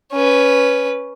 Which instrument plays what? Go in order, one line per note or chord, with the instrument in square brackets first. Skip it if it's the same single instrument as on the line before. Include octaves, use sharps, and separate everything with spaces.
[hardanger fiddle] C#4 B4